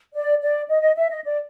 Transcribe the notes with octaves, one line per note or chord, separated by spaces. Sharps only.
D5
D5
D#5
D#5
E5
D#5
D5